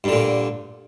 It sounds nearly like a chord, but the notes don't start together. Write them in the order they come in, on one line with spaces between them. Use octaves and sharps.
G2 D3 A#2